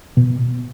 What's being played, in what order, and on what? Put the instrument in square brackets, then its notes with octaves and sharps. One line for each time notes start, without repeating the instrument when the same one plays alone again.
[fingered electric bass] B2